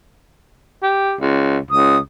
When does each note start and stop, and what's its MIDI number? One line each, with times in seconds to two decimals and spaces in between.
0.82 1.15 67
1.20 1.58 37
1.71 1.98 37
1.71 1.98 87